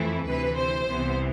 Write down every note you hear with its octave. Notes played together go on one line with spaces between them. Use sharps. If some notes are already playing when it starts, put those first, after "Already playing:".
Already playing: F2 E3 A3 E4
D2 C3 E3 B4
C5
C2 C3 E3 B3